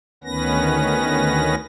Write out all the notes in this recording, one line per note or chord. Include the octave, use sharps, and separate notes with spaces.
D2 D#3 B3 C#4 B4 A#6